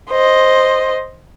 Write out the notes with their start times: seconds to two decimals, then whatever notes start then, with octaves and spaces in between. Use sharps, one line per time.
0.10 C5 D#5